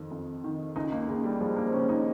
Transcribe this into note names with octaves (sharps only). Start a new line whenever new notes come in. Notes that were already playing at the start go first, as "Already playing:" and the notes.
Already playing: F2 D#3
F2
D#3
C#2 D#4
A#3
C#2 G#3
G3
F3 G#3
A#3
C4
C#3 C#4
D#4